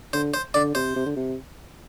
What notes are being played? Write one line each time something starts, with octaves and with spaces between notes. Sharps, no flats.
D3 C5
C5
D3 D5
C3 C5
C3
D3
C3